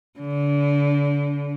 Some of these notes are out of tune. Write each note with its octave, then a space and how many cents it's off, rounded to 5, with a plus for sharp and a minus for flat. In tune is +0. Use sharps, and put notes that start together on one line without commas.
D3 -35